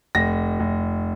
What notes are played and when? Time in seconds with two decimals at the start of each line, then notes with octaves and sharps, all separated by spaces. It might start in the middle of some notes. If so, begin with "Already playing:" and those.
0.15 F1 A#6
0.60 F1